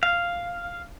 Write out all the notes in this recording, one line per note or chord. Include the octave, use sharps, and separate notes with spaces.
F5